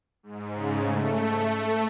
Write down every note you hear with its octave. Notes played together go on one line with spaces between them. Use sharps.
G#2
C#3
A3
A3